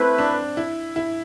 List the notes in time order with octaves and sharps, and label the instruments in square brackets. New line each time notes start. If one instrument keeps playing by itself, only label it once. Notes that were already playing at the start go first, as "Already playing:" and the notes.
Already playing: [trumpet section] A3 E4 B4 [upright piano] C4
[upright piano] D4
E4
E4